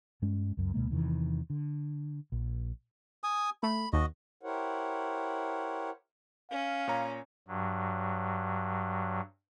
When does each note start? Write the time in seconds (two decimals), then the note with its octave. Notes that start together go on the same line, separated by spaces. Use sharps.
0.22 G2 G#3 C#4
0.57 C#2 F#2
0.74 D2 B2 G#3 A#3
0.91 E2 C3 D#3 E3
1.50 D3
2.32 A#1
3.24 G#5 D#6
3.63 A3 B5
3.93 D#2 F#4 D#5
4.43 E4 G4 A#4 C5 C#5 F#5
6.51 C#4 F5
6.87 A#2 C#5 A#5
7.48 G2 F#3